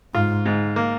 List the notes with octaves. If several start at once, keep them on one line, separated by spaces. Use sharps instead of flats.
G#2 F4
G#2
A#3